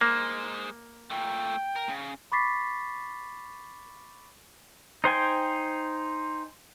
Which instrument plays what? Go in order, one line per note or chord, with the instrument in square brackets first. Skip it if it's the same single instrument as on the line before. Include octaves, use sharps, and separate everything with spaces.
[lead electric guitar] G#3 C5 [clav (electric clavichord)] A#3
[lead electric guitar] A#2 A3 [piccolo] G5
[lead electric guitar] A#4
C#3
[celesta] B5 C#6 D6 A6 B6 C7
[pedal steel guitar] D#4 C5 G5 G#5